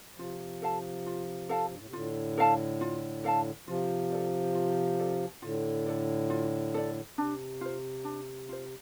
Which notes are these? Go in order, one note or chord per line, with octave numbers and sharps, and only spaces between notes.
C3 F3 F4
A4 F5 A5
F4
A4 F5 A5
G2
A2
C3
A2 D3 F4
A4 F5 A5
F4
A4 F5 A5
C3 F3 F4
A4 D5
F4
A4 D5
A2 D3 F4
A4 D5
F4
A4 D5
C3 D4
F4 C5
D4
F4 C5